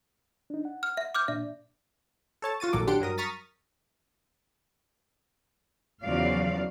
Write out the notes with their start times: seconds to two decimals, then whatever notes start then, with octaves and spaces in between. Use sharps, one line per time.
0.50 D4 D#4
0.65 F#5
0.83 F6
0.97 E5
1.15 D6 F6 G6
1.28 A#2 D4 D5 E5
2.42 A4 C#5 A5
2.60 F4 F#4 A6 D#7
2.73 A#1 A2 D#3 F#3 A4 D6
2.87 F#3 D4 G4 F#5 C6 D7
3.00 G2 F#3 A#4 D#6
3.18 A#5 C#6 D#6 F6 A6 B6
6.04 E2 C#3 F3 F#3 D5 F5